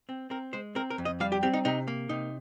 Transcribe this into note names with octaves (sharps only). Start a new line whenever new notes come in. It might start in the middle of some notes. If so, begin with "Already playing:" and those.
C4
C4 A#4
G#3 C5
C4 A#4
A#4
F2
D#5
G3 F5
G4
C4 G4
D#4
C3 D#4
A#3
C3 D#4